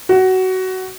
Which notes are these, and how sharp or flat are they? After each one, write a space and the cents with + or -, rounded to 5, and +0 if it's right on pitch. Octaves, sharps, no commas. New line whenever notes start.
F#4 +15